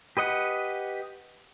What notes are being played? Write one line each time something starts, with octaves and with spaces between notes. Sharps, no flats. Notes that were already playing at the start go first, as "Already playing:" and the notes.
G4 B4 D#5 F#5